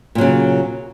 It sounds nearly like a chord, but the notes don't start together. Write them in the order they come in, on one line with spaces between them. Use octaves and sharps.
A#2 F#3 C#3